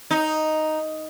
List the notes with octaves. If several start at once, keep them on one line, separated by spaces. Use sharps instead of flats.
D#4